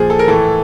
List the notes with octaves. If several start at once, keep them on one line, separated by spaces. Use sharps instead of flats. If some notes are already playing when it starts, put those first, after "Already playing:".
Already playing: A#2 F3 G#4
A4
A#4
A2 E3 A4